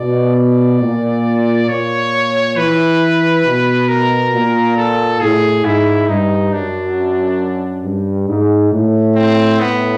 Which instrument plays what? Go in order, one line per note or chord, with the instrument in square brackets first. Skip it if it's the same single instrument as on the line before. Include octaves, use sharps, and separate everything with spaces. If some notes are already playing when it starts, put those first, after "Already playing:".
Already playing: [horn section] B2 [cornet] D5
[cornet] D5
[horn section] A#2
[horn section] A#2 [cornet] C#5
[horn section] E3 [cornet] B4
[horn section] B2
[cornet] A#4
[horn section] A#2
[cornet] A4
[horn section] A2 [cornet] G#4
[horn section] G#2 [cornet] E4
[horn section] G2 [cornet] D#4
[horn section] F#2 [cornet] D4
[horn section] G2
G#2
A2
[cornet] C4
[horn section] A2 [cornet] B3